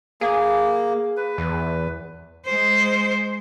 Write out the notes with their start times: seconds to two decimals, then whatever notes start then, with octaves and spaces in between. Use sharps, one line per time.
0.21 A#3 G#4
1.17 B4
1.38 E2
2.46 G#3 C5